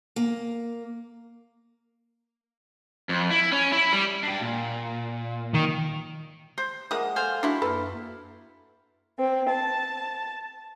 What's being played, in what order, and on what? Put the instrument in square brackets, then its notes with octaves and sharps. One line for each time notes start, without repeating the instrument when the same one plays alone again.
[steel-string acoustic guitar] A#3
[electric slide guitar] F2
E4
C#4
E4
G3
D4 G4
A#2
[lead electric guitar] D#3
[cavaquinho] C5
[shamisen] F3 G#3 A#3 [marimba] E5 F#5 [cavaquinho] D#6
[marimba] A4 [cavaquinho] C5 F5 G#5
[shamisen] D4 F#4 [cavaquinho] E4 C6
[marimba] F#2 A#3 F6 [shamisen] A4 B4
[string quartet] C4
A5